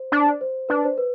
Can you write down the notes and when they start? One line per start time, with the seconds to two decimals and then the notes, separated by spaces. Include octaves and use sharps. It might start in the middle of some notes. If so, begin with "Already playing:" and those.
Already playing: C5
0.12 D4
0.41 C5
0.69 D4 B4
0.84 C5
0.98 B4